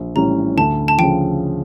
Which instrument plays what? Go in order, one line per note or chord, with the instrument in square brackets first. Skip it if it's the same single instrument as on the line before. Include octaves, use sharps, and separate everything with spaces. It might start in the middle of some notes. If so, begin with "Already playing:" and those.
Already playing: [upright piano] A#1
[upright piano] A2 G3 C#4 [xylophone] A#5
[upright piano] D2 [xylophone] A5
[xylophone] A5
[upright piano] C#3 F3 [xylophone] G5